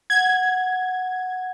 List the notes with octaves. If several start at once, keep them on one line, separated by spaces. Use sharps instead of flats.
F#5 G#6